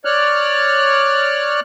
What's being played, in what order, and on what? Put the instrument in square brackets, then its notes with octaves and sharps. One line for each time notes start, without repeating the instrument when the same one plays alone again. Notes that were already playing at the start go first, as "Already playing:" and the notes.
[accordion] C#5 D5 F6 F#6